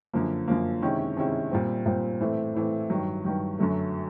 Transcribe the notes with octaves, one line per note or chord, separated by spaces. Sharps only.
F#2 D3 F3 A#3
F#2 D3 F3 A#3
C3 D#3 G#3 C#4 E4
C3 D#3 G#3 C#4 E4
A#2 G3 C4
A#2 G3 C4
A2 E3 A3 C4
A2 E3 A3 C4
G2 D#3 F#3
G2 D#3 F#3
F#2 D3 F#3 A3